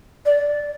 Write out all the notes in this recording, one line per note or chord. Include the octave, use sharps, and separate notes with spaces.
D5